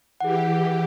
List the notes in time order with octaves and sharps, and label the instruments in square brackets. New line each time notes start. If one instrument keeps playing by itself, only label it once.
[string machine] E3 G4 [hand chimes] G#4 F#5